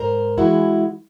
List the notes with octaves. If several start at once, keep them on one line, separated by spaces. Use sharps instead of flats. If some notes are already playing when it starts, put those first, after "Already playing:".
Already playing: G#2 A#4 C5
E3 G#3 E4 F#4